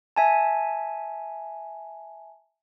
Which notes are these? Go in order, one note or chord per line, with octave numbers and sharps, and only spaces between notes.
E5 G#5 A5